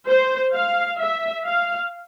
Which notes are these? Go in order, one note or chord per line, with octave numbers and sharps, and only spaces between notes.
C5
F5
E5
F5